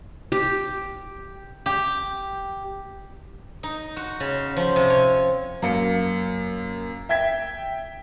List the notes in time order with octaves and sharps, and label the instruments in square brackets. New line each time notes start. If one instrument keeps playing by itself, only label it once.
[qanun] G4
[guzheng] G4
D#4
F#4
C#3
F3
C3
C#5
[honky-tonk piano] F#2 A#3 C#7
E5 G5 G#6 B6